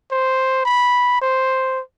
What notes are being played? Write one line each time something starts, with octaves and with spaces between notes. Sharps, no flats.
C5
B5
C5